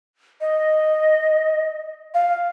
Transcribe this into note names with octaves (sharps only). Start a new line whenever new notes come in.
D#5
F5